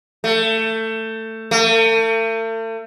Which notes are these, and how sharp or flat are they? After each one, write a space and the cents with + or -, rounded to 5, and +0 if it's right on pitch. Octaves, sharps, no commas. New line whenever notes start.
A3 +20
A3 +40